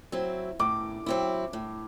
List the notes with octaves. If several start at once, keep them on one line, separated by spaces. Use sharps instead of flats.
F#3 C4 E4
A2 D6
F#3 C4 E4
A2